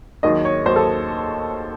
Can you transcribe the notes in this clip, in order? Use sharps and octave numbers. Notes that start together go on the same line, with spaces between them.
D#2 D#3 F#3 D#5
C#5
D#2 D#3 F#3 C5
A4